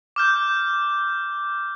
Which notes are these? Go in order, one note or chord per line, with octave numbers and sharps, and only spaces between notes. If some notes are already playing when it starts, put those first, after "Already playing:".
D6 F6 G6